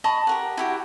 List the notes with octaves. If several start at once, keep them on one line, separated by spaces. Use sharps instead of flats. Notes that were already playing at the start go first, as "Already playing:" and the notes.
D#5 A5 B5 C#6
G4 A#4 F#5
E4 F#4 G4